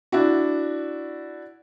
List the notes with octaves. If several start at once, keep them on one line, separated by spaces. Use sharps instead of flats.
D4 E4 F#4